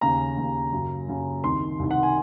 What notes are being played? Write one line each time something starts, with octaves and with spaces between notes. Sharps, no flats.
D#2 C#3 A#5
D#2 C#3
F#2 C#3
F#2 C#3
C2 C3 D#3 C6
C2 C3 D#3
F#5
G#5